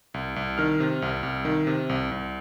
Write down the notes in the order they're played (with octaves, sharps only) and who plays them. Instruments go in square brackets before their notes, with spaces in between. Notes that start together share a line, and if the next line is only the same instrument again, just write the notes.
[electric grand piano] C2
C2
D#3 F6
C3
C2
C2
D#3
C3
C2
C2